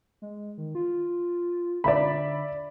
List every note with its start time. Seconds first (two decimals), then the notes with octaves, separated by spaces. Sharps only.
0.22 G#3
0.58 D#3
0.75 F4
1.84 D3 D5 E5 B5